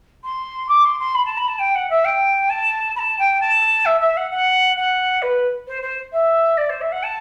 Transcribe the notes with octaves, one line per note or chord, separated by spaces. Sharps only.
C6
D6
C6
C6
B5
A5
B5
A5
G5
F#5
E5
G5
A5
B5
A5
G5
A5
E5
E5
F#5
F#5
F#5
B4
C5
C5
E5
D5
C5
E5
F#5
A5